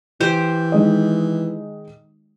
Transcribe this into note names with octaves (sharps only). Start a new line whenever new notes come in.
E3 G4 C5
D#3 G#3 D#5